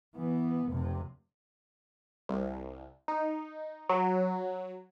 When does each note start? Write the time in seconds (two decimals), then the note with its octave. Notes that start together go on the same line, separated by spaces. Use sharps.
0.16 E3 B3
0.68 F1 C3
2.29 C2
3.08 D#4
3.89 F#3